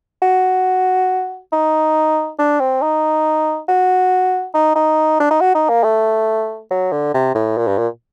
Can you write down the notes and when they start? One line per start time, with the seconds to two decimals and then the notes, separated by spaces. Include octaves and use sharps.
0.22 F#4
1.52 D#4
2.39 D4
2.60 C4
2.82 D#4
3.68 F#4
4.54 D#4
4.76 D#4
5.20 D4
5.30 D#4
5.41 F#4
5.55 D#4
5.69 A#3
5.84 A3
6.71 F#3
6.92 D3
7.14 C3
7.35 A2
7.57 A#2
7.67 G2
7.78 A#2